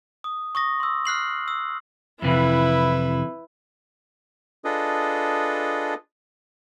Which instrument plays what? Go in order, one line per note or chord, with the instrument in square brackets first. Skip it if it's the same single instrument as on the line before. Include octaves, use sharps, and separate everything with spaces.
[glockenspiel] D#6
C#6 D#6 A#6
C6 E6
F6 F#6 C7 F#7
E6
[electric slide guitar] F2 C3 E3 [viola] E4 B4
[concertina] D4 F4 G#4 A4 B4 D#5